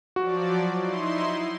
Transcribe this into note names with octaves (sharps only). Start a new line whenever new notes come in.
F3 F#3 F#4 D5
D#4 E4 C6